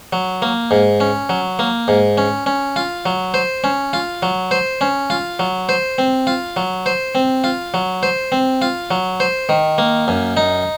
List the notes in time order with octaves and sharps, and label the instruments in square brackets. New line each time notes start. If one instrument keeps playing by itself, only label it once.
[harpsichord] F#3
A#3
G#2
C#4
F#3
A#3
G#2
C#4
C#4
F4
F#3
C5
C#4
F4
F#3
C5
C#4
F4
F#3
C5
C4
F4
F#3
C5
C4
F4
F#3
C5
C4
F4
F#3
C5
D#3
A#3
F#2
D#4